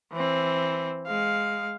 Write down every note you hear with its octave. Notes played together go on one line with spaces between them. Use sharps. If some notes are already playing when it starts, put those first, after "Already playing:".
E3 C4
G#3 F5